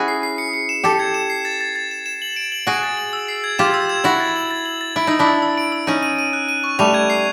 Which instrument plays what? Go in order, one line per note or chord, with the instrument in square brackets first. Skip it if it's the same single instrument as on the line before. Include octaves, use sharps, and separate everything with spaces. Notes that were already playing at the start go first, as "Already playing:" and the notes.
Already playing: [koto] C#4 E4 F#4 G#4
[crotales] C7
C7
C#7
C#7
E7
[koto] G4 A4 [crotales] E7
[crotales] G#6
E7
C7
A6
A6
A6
E7
E7
F#7
D7
F#7
[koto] F#4 G#4 [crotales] D7
[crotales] A6
F#7
E6
C7
G#6
[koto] F4 G4 [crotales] E7
[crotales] E6
G#6
[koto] E4 F#4 [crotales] F#7
[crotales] A6
F#7
A6
F#7
A6
[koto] E4 [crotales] D7
[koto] D#4 [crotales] E6
[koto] D4 E4
[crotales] E6
E6
D7
E6
[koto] C#4 D#4 [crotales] D#7
[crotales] D#7
D#7
F#6
D#7
C#6
[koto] G3 A3 [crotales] F7
[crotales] G#6
C7